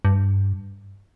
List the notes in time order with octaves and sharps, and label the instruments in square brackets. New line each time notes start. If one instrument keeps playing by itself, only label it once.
[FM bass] G2